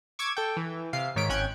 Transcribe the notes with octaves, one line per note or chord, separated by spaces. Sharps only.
C#6 D6 E6 G#6
A4 G5
E3
C3 F5 C7
G#2 D#3 C#5 B6 D7
G#1 C#4 G5 F#6 G#6